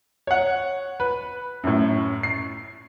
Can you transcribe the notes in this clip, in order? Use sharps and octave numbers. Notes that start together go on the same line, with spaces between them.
C#5 F#5
B4
F#2 A2
C7